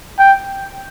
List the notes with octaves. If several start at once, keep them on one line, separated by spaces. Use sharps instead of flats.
G5